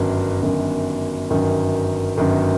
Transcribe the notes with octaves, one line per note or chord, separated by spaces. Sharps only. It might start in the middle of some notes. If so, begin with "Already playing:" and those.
Already playing: G1 F#2 D#3
G1 F#2 D#3
G1 F#2 D#3
G1 F#2 D#3